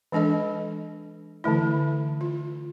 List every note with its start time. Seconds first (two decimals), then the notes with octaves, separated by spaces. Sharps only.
0.12 E3 G#3 D4 A4 D#5
1.44 D3 E3 A3 E4
2.21 F4